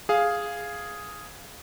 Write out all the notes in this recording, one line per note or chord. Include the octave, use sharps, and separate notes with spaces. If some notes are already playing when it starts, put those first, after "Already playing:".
G#4 F5